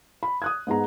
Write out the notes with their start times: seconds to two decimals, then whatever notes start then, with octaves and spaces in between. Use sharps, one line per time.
0.23 B5
0.42 D#6 F#6 G#6
0.67 G#2 B3 G#4 A#5